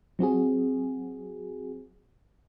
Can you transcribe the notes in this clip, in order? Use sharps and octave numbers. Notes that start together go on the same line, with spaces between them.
F#3 C4 F#4 G#4